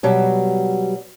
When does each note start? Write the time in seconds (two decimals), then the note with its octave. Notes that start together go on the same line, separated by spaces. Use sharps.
0.03 B2 F#3 G3